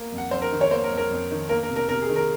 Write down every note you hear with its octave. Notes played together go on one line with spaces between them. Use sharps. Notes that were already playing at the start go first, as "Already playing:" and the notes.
Already playing: A#3
F2
F#5
F2 C5
A#4
D#3
C#5
A#3 C5
A#4
F2
A#4
F2
D#3
A#3 A#4
A#4
C3
A#4
C3 A#4
G#4
D#3
A#4